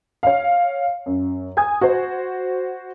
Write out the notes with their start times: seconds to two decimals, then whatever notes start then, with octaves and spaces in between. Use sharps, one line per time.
0.23 C#5 F5
1.06 F#2
1.57 G#5 D#6 G#6
1.81 F#4 C5